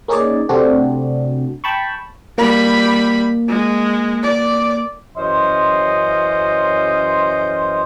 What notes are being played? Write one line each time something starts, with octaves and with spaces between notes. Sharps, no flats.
A#3 C#4 D#4 G#4 C#5 D5
C3 A3 C4 D4 F#4
G5 A5 B5 C#6
G3 A#3 B5
G#3
D5
F#2 E3 C#4 C5 D#5 C6